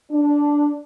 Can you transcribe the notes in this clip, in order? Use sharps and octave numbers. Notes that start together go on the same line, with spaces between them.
D4